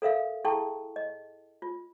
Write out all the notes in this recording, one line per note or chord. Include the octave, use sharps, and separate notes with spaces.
A4 A#4 E5 F5
E4 G#4 A4 G5 A5 C#6
D#5
F4